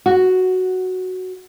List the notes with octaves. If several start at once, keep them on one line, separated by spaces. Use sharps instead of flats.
F#4